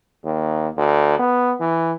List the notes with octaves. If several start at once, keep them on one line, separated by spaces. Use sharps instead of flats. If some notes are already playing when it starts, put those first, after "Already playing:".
D#2
D2
B3
E3